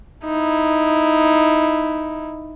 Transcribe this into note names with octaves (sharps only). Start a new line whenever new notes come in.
D#4 E4